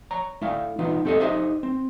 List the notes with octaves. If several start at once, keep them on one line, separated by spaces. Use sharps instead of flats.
C#5 A#5
A3 E4 F5
E3 B3 D#4 F4
C4 G4 A4 B4 D#5
D#4 G4 C5 D#5 E5
C4